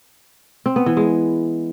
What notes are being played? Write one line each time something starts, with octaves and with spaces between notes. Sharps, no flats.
C4
B3
E3
G#3